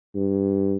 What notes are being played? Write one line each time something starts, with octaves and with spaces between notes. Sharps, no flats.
G2